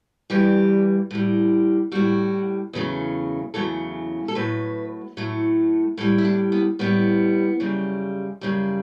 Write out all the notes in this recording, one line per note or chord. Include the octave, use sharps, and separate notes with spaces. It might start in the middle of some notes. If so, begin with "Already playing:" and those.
G2 E3 G3 G4
A2 G3
A2 G3 F#4
E2 C#3 F#3 A3
E2 C#3 F#3 A3 A4
A4
A2 F#3 A3 B4
A2 F#3 A3
A2 G3 A4
E4
D4
B3
A2 G3 B3
F#2 C#3 G3
F#2 C#3 G3